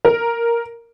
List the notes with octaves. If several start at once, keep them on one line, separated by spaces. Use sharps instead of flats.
A#4